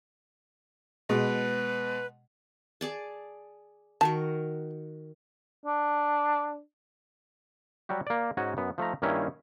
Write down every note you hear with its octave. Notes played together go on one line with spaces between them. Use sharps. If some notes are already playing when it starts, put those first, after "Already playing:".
B2 G#3 B4
G#4 D5 A5
D#3 F#4 A#4 A5
D4
F#3 G3 F#4 G4
A#3 D5
G#2 C#4 D#4 F#4 G#5
F#2 B3
F3 A3 D#4 A#5
G2 D#3 A#3 C#4 E4